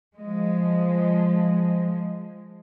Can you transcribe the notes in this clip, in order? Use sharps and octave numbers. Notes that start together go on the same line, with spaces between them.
F3 G#3